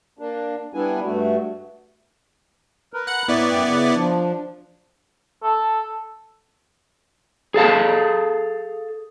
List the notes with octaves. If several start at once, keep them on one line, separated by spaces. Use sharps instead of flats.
A#3 D4
G3 B3 D4 E4 G#5
G2 A3 F#4
A#4 B4
F#5 F#6
A2 B3 E4 C#5 D5
F#2 G5
C#3 F#5
F3 D4
A4
G#4 A4 F5 A5